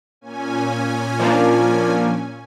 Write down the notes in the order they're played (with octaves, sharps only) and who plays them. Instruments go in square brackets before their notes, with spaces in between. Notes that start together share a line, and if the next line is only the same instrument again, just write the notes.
[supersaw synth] A#2 C#4 G#5
[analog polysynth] F3 A#3 D4